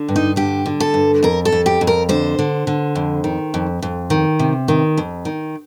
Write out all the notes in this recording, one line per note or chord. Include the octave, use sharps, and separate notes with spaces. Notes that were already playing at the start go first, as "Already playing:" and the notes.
Already playing: D3
G2
D#4
D3 G4
D3
A4
G2
F2 A#4
A4
F2
G4
F2
A#4
D3 C5
D3
D3
F2
D#3
F2
F2
D#3
C3
D#3
F2
D#3